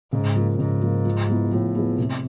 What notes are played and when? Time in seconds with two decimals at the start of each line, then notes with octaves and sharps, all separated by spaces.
0.12 G#2 C#3
0.36 F3 A#3
0.59 G#2 C#3
0.82 F3 A#3
1.05 F3
1.29 G#3 B3 E4
1.51 A2 F3
1.75 G#3 B3 E4
1.98 C3